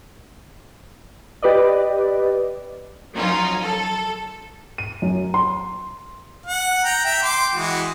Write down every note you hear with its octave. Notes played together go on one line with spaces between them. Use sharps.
G4 B4 D5 D#5
F3 F#3 C#4 D#4 F4
A4
D#7
F#2
C6
F#5
G5 A#5
E5 G5
G5 C6 D6
E3 G#3 F#4